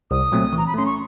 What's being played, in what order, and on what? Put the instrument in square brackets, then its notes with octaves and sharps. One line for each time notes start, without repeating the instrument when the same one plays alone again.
[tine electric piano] C2 [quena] D#6
[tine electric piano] A#2 F#3 A3 C4
[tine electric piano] E3 [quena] A#5
[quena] B5
[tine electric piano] A3 C#4 [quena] C6
[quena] C#6